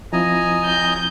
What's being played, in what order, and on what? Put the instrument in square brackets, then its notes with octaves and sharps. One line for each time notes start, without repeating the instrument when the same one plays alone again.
[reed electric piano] F3 C4 E4 [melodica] D#5 G#5 A#5
[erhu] G6